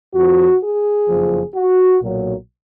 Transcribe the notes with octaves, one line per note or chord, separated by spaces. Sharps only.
F2 F#4
F3
G#4
F#1 F2 F3
F#4
B1 A#2 F#3